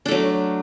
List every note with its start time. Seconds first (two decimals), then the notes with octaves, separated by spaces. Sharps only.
0.06 D4
0.08 A3
0.11 F#3